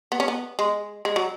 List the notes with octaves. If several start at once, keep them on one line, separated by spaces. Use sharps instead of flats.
B3
C#4
B3
G#3
G#3
F#3